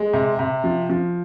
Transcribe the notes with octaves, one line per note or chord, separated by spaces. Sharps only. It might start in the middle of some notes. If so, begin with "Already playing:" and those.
Already playing: G#3
C3
C3
F3
F3